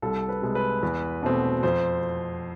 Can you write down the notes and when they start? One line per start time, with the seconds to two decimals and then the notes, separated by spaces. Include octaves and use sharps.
0.02 C2 A4
0.29 B4
0.42 C3 G#3
0.55 B4
0.83 E2
1.23 B2 A3 C4
1.63 F2 C5